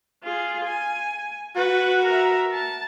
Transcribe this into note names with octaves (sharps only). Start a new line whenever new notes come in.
F4 G#4
G#5
F#4 B4 F#5
A#4 E5
A5